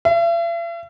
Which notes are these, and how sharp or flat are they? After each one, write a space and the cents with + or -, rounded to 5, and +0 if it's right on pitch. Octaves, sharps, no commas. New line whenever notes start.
E5 +45